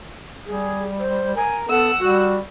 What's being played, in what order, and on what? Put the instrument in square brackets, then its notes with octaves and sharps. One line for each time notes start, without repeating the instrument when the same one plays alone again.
[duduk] G3 [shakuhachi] G#4
[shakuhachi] C5
[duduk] A#4 [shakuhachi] G#5
[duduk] B3 [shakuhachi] A4 [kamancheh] F#5 E6
[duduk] G3 [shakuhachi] F#4